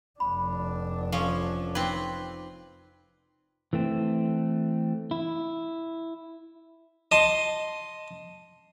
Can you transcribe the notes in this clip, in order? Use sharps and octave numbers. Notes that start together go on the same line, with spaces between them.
F1 D4 B5
F3 C#4 A4
C4 D#4 B4 G5 D6
E3 A3 C4
E4
D#5 A5 C6